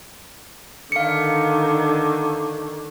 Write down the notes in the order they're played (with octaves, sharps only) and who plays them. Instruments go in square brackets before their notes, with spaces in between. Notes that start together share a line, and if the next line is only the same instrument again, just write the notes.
[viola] D3 D#3 [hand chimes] F5 C#7